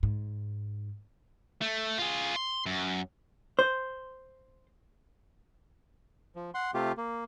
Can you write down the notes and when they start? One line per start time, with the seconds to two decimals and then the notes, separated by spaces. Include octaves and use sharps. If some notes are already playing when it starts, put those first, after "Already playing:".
0.03 G#2
1.61 A3
1.98 F4 G#4
2.36 C6
2.66 F#2
3.59 C5
6.36 F3
6.54 F#5 C6
6.74 C3 A3 F4 G4
6.98 A#3